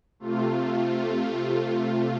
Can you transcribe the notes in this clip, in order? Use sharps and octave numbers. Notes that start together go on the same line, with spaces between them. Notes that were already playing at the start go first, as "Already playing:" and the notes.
C3 A3 F4